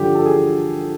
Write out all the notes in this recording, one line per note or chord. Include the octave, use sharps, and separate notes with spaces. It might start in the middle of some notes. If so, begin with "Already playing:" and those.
Already playing: G2 D3 F3 G4
A4
G#4